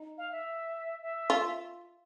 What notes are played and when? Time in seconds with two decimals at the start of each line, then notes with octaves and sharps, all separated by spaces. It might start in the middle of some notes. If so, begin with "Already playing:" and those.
Already playing: D#4
0.18 F5
0.32 E5
1.02 E5
1.30 F4